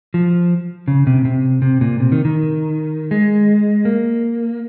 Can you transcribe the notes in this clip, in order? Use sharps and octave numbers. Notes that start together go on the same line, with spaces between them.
F3
C#3
C3
C3
C3
A#2
C3
D#3
D#3
G#3
A#3